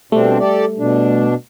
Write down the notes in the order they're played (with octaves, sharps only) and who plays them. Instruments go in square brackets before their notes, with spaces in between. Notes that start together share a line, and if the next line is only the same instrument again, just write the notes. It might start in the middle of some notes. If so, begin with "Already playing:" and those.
[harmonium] B2 C4 D4 [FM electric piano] G3 A3
[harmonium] G4 A4 D5
B2 D4